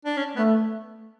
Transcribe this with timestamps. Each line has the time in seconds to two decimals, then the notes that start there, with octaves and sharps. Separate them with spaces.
0.05 D4
0.17 C#4
0.36 A3 B3